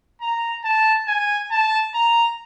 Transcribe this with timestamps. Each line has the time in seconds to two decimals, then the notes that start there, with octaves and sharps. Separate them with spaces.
0.21 A#5
0.64 A5
1.08 G#5
1.51 A5
1.94 A#5